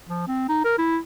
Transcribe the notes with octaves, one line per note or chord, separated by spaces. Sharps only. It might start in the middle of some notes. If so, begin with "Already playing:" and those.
F3
C4
D#4
A#4
E4